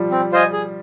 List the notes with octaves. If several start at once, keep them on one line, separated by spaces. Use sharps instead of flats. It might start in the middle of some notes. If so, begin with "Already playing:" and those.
Already playing: F3 G3
C4
F4 C5 D#5 G#5
G#4